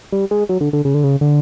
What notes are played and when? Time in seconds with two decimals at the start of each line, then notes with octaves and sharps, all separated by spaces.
0.12 G3
0.31 G#3
0.49 F#3
0.61 D3
0.73 D3
0.85 C#3
0.94 D3
1.04 C#3
1.21 D3